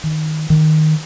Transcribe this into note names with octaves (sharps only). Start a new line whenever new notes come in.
D#3
D#3